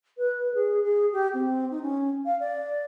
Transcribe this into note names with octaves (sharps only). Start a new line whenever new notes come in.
B4
G#4
G#4
G4
C4
D#4
C#4
F5
D5